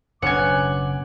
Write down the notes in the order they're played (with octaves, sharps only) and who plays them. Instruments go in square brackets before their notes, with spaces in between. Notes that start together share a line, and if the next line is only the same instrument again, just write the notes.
[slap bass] F#1 B2 D4 [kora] B3 C#4 [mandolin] F#5 G#5 [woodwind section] D6